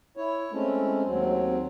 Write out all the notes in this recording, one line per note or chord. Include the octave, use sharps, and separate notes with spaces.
E4 C#5
G#3 A3 C4 C#4
D#2 F#3 C4